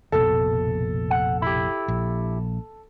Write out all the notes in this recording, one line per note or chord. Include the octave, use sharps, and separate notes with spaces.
F1 A#1 B2 A4
F#5
E4 G4
A#1